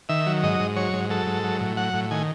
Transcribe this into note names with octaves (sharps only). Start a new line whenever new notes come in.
D#3 E5
F#3
G#2 D#5
G#2
F#3 C#5
G#2
F#3 A4
G#2
F#3
A2
F#3 F#5
A2
D#3 G#5